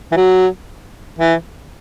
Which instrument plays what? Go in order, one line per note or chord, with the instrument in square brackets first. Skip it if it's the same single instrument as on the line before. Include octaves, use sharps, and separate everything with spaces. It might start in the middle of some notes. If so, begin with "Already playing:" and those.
[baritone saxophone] E3
F#3
E3